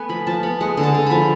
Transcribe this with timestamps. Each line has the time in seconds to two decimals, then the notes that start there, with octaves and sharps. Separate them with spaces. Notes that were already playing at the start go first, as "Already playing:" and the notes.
Already playing: A3 B3 B4 G#5
0.09 F3 B5
0.27 F3 A5
0.43 B3 B5
0.61 G#3 F#5
0.77 D3
0.83 A5
0.95 D3
1.06 F3 B5